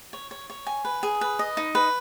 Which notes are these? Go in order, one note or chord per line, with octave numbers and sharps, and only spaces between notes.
C#5
C#5
C#5
G#5
B4
G#4
B4
D#5
D#4
B4